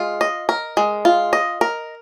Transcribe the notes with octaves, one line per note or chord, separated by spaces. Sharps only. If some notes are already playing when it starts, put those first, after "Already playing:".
Already playing: G#3 F4
D#5
A#4
G#3
F4
D#5
A#4